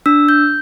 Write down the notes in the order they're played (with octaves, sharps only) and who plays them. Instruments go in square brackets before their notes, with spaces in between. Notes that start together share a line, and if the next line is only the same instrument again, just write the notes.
[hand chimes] D4 E6
G6